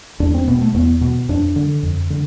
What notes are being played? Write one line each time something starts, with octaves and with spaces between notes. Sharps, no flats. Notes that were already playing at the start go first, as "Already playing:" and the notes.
E2 D4
C4
B2 B3
A3
E2 B3
B2
F2 D4
D3
F2
D3